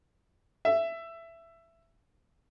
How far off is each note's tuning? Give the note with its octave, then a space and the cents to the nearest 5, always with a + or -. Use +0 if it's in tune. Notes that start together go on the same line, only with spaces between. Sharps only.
E5 +15